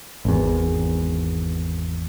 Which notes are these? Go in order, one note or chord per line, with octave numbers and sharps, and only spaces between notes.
G#1 E2